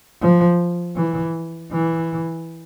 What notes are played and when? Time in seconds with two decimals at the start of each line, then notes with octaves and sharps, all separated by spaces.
0.21 F3
0.96 E3
1.71 E3